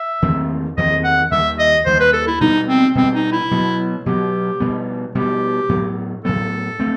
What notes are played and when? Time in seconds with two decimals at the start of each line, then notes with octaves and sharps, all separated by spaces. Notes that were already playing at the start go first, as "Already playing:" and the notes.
Already playing: E5
0.22 E2 D#3 A3 C4
0.77 E2 D#3 A3 C4 D#5
1.04 F#5
1.31 D#2 D#3 G3 E5
1.59 D#5
1.86 D#2 D#3 G3 C5
2.00 B4
2.13 A4
2.27 E4
2.41 B2 G3 B3 D#4
2.68 C4
2.95 B2 G3 B3 C4
3.14 D#4
3.32 E4
3.51 B2 F#3 B3
4.06 B2 F#3 B3 G4
4.60 B2 G3 B3
5.15 B2 G3 B3 G4
5.69 A2 F#3 B3
6.25 A2 F#3 B3 A4
6.80 A3 C4